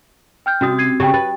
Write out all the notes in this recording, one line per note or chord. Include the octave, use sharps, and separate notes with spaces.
G5 F6 G6
C3 C#4 F#4 D#6
G#6 C7 D#7
C#3 G4 G5
B4 A6